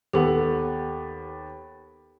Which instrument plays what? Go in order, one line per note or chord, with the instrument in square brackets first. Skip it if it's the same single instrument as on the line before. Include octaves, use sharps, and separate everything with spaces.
[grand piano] D#2 B3 [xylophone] G4 A4 F#5